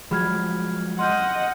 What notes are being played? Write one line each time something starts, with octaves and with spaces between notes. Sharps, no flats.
F3 F#3 G#3 B5 F6 G#6
D#5 F#5 C6 F6 G6